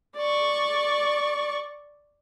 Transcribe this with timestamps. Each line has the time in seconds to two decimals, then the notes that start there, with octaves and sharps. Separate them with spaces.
0.17 D5 C#6